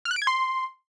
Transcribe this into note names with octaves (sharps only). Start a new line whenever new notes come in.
F6
F#6
D7
G#6
C6